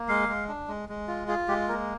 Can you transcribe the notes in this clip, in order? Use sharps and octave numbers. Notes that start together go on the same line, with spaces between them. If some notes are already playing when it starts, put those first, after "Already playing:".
Already playing: A#3
G#3 F5
G#3
D4
G#3
G#3
F4
F4 G#4
G#3 G4
A#3 A#4